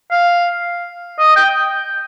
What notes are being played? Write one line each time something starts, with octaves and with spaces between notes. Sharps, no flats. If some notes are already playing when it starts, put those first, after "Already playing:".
F5
D#5
G5